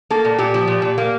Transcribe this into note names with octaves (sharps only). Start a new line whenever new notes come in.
A#3 A4
A#2
A#2 G4
F3
A#2
A#2
A#3